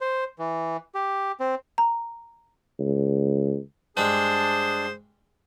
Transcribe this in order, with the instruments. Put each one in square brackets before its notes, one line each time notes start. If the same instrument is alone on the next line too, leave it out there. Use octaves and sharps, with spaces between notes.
[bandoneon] C5
E3
G4
C4
[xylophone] A#5
[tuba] C#2
[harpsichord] G2 G#3 [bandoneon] D4 A5 [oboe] G#4 [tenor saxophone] C5